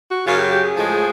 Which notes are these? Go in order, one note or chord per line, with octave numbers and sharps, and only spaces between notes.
F#4
F#2 C#3 F#3 F4
G4
G4
G#4
A2 F3 G#3